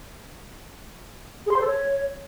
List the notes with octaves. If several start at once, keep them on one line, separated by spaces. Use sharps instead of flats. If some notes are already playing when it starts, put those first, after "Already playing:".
G#4
C6
C5
A4
C#5